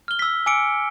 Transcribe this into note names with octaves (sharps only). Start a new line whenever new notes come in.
F6 G7
E6 B6
G#5 D6 E6 C#7 D7